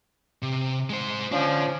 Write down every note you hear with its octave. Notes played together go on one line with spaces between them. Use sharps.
C3
G#3 C5
D3 F3 C#4 D4